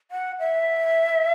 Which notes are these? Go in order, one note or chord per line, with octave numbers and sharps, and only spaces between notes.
F#5
E5